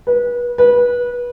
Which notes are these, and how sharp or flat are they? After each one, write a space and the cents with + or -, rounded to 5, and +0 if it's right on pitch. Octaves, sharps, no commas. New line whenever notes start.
B4 -30
B4 -25